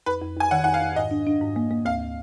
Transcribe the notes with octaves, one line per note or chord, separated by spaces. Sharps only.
F2 B4
F2
F2 G#5
D#3 F#5
F2 F#5
F5
F2
G#2 D#5
D4
D4
G#2
A#3
A#3
D2 F5